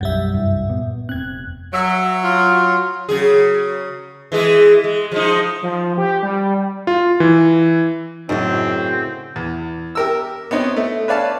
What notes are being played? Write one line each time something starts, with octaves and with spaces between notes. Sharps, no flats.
F#1 B1 F#2 G3 E5
C2 G2
A#2 B3
F1 C4 F#6 G#6
F#3 E5
F4
C#3 F#3 G#4
E3 G#3 G#4
G#3
F3 G#3 D#4
F3
G4
G3
F4
E3
F#2 A2 C#3 C4 D#4
E2
G4 A#4 E6
B3 C4 D#4 C#5
A3
B4 C#5 D5 F5 A5